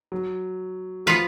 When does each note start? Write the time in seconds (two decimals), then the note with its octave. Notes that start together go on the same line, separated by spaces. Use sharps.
0.12 F#3
1.06 F3 B3 F4 B4 F5